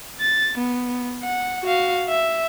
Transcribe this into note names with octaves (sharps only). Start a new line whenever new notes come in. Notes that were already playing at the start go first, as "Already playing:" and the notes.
A6
B3
F#5
F#4 F5
E5